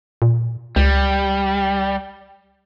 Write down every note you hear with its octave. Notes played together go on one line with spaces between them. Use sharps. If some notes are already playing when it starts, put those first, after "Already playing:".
A#2
C#2 G3